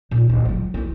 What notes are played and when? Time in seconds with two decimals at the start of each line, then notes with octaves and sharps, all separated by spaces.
0.11 A#2 D#4
0.29 D1
0.45 C#2 F#3
0.74 D2 E4